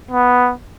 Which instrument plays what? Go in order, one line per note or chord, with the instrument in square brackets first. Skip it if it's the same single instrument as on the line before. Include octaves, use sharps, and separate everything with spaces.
[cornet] B3